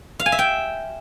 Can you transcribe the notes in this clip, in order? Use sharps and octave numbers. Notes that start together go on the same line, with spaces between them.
F5
G#5
E5
G5